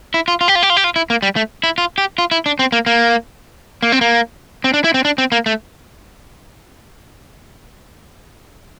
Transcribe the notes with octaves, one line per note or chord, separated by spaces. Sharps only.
E4
F4
F4
G4
F4
G4
F4
G4
F4
E4
A#3
G3
A3
E4
F4
G4
F4
E4
D4
C4
A#3
A#3
A#3
C4
A#3
C4
D4
E4
C4
D4
C4
A#3
A3